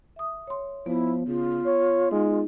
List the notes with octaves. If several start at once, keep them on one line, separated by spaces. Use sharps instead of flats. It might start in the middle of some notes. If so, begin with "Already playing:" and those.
E5 D#6
C#5 C6
F3 B3 E4
C#3 F4
C#5
G#3 D#4